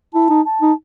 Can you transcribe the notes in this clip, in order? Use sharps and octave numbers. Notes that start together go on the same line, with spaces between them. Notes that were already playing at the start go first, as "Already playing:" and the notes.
E4 A5
D#4
A5
D#4